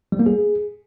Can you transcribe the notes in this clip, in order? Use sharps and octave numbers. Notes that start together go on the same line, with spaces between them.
G3
A#3
G#4